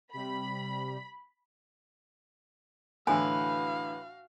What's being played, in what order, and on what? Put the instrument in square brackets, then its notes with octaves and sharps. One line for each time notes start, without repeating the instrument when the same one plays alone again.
[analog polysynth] C3 G3 [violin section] B5
[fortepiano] A2 D3 E3 [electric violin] F#4 F5 [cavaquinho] B4 [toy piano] G#5